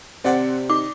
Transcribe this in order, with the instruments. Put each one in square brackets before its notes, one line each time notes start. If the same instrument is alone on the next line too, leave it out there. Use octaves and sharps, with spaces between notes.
[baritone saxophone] C3 [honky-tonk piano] C4 F#5 [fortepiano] D5
[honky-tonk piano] D#4 [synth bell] D6